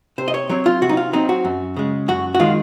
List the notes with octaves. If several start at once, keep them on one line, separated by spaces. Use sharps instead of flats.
C3 C5
D#5
C#5
F#3 C4 C#5
F4
C3 F#4
D#4
F4
F#3 C4 D#4
F#4
F#2
C#3 G#3
F#2 F#4
F#4
D#3 G#3 F4